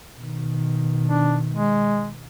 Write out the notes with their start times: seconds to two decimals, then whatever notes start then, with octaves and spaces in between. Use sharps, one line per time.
0.18 B2 D#3
1.07 D4
1.51 G#3